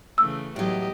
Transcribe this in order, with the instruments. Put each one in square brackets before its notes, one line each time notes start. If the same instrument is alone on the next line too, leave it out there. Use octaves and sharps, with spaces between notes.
[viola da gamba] C#3 E3 A3 [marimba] E6
[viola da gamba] E2 G4 D#5 [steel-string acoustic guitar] A2 F#3